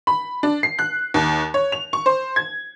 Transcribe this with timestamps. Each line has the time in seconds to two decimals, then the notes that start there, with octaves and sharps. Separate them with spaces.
0.07 B5
0.43 D4
0.63 C7
0.79 F#6
1.14 D#2
1.54 C#5
1.72 F7
1.93 C#6
2.06 C5
2.36 G#6